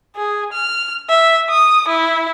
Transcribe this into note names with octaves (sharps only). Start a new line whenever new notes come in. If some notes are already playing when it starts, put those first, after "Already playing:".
G#4
F6
E5
D#6
E4